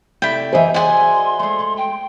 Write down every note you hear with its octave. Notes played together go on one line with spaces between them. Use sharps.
C3 A3 E4 D5 G5
F#2 E3 C5 D#5 E5 G#5
F#4 G#4 D5 F#5 G#5 C6
G#3 A3
G5